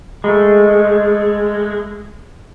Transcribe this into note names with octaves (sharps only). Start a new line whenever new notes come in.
G#3 A3